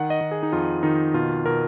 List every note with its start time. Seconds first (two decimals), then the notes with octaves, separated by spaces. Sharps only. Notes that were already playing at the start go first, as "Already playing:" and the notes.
Already playing: D#3 F#5
0.10 D#5
0.21 D#3
0.31 G#4
0.43 D#4
0.52 F2 F4
0.83 D#3 D#4
1.14 B2 F4
1.46 B2 A#4